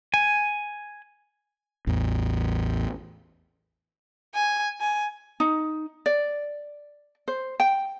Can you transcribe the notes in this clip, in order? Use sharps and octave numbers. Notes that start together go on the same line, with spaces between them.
G#5
A1 E2
G#5
G#5
D#4
D5
C5
G5